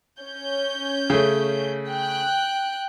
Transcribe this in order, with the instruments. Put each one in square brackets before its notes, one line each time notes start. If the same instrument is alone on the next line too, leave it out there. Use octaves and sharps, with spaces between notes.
[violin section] C#4 C#5 G6
[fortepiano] C#3 A3
[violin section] G5 F#6